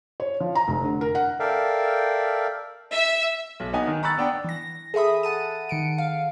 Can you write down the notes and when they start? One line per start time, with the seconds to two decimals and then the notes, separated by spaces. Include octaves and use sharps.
0.20 C#5
0.40 F3
0.55 A#5
0.68 F1
0.84 D3
1.01 A#4
1.15 F#5
1.40 A4 A#4 D5 E5 F5 G5
2.92 E5
3.60 B1
3.73 B3 D#4 G#5
3.87 D#3
4.03 A#5 B5 C#6 E6 F#6 A6
4.18 B3 D4 G5
4.44 E3 A#6
4.94 G#4 A4 E5 B5 D#6
5.23 F#5 A5 D#7
5.69 D#3 C#7 D7
5.98 F5